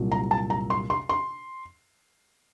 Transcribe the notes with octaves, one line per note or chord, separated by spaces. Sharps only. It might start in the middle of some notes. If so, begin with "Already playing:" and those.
Already playing: C2 A#2 F#3
A#5
A5
A#5
C6
C6
C6